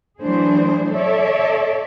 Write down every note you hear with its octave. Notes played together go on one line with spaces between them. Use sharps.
E3 F#3 A3 D4 G#4 C5
A4 C#5 D5 E5